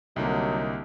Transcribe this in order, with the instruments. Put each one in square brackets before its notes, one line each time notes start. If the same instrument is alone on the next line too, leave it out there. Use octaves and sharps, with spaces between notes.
[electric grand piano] C2 D3 A#3 [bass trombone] F#3 [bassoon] D#4